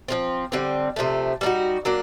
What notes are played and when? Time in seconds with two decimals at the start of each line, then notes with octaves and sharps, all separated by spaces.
0.08 F3 G#3 C4
0.52 D3 G3 C4
0.96 C3 F3 A3
1.41 G3 C4 D#4 F#4
1.85 F#3 A#3 D4